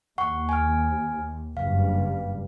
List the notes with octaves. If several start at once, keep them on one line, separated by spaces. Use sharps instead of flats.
D#2 F#5 C#6
G#5 F6
F#1 G2 F5